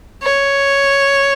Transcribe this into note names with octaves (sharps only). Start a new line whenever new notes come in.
C#5